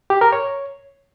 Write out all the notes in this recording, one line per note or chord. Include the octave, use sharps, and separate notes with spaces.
G4
A#4
C#5